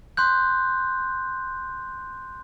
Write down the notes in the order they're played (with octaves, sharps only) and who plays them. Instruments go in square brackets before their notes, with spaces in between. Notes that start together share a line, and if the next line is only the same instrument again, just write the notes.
[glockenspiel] C6 F#6 G6